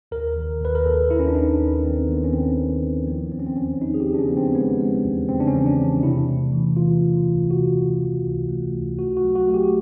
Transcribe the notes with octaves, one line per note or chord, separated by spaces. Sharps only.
D#2 A#4
D#3
D#2 B4
A#4
D#2 A4
D#2 E4
C#4
D4
D#2 D#4
D#2
D#3 C4
D#3 B3
C#4
D#3 C4
D#3
D#3
F3 B3
E2 C4
C#4
C4
E2 C#4
E2 D#4
G#4
G4
C#3
D4
C#4
F3 B3
C4
G#3 B3
G#3
E2
C#3 C4
D4
C#4
E2
D4
E2
D4
C3 E4
A3
E3
E3 F4
E3
C#2
C3 F#4
C3
E3
C#2
A3
C#2
A3 F#4
F#4
F#3
F#4
A3
G4